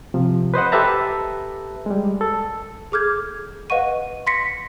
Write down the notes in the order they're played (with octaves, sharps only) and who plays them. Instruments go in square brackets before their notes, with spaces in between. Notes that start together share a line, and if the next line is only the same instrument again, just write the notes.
[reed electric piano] C3 F3
B4 C5 D#5 F#5
G4 A4 B4 E5 A5 A#5
G3 G#3
A4
[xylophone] G#4 A4 D6 F6 G6 G#6
B4 D#5 F5 F#5 C#6 D#7
C6 A#6 B6 C#7